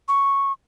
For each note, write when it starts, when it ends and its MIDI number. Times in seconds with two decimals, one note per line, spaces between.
0.08 0.52 85